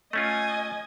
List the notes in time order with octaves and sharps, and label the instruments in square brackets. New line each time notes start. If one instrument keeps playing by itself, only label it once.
[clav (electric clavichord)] A3 C#4 F4 [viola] D#5 G#5